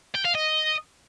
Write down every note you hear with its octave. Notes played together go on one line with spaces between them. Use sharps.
G5
F5
D#5